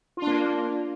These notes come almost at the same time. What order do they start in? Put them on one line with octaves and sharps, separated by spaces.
F4 D4 A#3